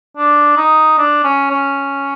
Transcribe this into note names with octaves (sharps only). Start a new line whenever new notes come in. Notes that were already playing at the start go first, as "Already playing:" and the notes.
D4
D#4
D4
C#4
C#4